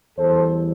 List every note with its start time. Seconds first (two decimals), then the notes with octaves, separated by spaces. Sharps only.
0.18 E2 E3 G3 A4 C5